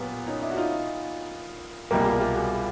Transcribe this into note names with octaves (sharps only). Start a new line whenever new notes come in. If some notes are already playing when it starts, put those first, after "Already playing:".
Already playing: A#2 F#3 B3 F4 G4
C#4 D#4
D4 E4
F#4
D#4 F4
C2 B2 G3 A#3 E4 F#4
G#4
F4 G4
F4 G4
F#4 G#4